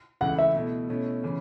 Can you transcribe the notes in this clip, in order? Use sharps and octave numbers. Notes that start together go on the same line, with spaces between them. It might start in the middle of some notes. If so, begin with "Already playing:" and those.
C#2 C#3 E3 A3 E4 F#5
E5
B2 A3 E4
B2 A3 C#4 E4
C#3 E3 C#4